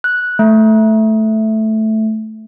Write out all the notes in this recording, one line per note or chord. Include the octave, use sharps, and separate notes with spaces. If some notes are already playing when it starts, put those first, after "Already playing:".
F#6
A3